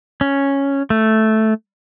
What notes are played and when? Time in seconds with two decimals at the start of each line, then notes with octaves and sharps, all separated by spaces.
0.21 C#4
0.90 A3